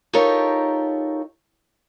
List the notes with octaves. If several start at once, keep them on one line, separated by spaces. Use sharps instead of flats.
D#4 F4 G4 A4 A#4 C#5